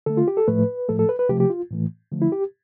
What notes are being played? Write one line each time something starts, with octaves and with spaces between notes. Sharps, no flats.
D3 A3 A4
F4
G4
A4
A2 F3 A3 B4
A2 F3 A3 A4
A4
B4
B4
C3 F3 A3 G4
G4
F4
A2 E3 A3
D3 F3 A3
E4
G4